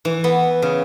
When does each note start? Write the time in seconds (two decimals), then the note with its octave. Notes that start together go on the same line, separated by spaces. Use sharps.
0.05 E3
0.24 B3
0.62 C#3